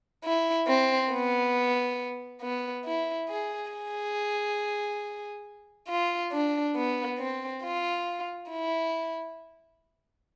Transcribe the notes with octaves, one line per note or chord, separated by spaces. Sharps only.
E4
C4
B3
B3
E4
G#4
G#4
F4
D4
B3
C4
F4
E4